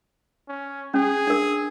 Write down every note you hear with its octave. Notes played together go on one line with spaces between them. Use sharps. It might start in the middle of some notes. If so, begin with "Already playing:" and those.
C#4
C#4 G#4
D4 A#4